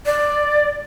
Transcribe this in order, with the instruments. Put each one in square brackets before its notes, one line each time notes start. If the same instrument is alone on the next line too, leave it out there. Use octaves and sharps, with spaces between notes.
[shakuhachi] D5